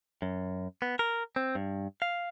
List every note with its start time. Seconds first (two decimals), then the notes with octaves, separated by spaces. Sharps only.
0.22 F#2
0.82 B3
0.99 A#4
1.36 C4
1.55 G2
2.02 F5